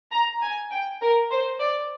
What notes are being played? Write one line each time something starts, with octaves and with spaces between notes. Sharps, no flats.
A#5
G#5
G5
A#4
C5
D5